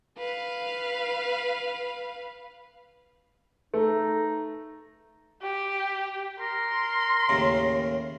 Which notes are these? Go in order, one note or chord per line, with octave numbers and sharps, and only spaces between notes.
B4 F5
A3 D#4
G4
A#4 C6
D#2 A2 C#3